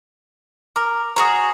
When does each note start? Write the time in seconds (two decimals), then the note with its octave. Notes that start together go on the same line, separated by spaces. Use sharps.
0.76 A#4 D6
1.16 F#4 G#4 C#5 A#5 D#6